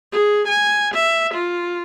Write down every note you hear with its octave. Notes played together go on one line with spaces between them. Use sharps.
G#4
G#5
E5
F4